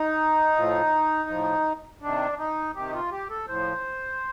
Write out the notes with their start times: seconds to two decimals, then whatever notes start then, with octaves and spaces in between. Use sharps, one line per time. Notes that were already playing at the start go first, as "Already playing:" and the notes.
Already playing: D#4
0.56 A2 F3
1.29 A2 F3
2.02 C3 D#3 D4
2.39 D#4
2.75 C3 D#3 G4
2.89 D#4
2.93 F4
3.11 G4
3.29 A4
3.48 A2 F3 C5